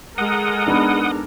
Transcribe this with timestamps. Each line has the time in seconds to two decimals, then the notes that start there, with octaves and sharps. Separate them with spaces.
0.18 G#3 A4 A#4 F#5 D#6
0.66 B3 D4 D#4